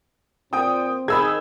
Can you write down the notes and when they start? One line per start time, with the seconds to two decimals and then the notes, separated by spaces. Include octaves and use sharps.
0.53 A#2 C4 G5 D#6
1.08 D#3 G#4 B5 E6 G#6